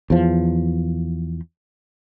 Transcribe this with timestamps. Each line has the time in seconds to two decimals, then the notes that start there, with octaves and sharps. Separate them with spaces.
0.10 E2 F3